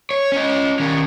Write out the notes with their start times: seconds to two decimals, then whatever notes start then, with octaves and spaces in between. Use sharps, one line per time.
0.11 C#5
0.32 C#4 D#5
0.80 D#3 C#4